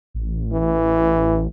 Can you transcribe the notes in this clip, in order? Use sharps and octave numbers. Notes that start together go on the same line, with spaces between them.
A1
E3